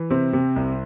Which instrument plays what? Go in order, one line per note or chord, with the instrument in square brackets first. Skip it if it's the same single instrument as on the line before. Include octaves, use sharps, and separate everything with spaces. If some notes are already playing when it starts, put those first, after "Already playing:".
Already playing: [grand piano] E3
C3 C4
C3
C2